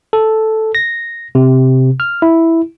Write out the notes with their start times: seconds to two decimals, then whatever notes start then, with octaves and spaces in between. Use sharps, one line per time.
0.13 A4
0.75 A#6
1.35 C3
2.00 F6
2.22 E4